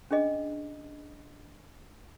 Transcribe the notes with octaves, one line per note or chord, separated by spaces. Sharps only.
C#4 D4 G#4 D#5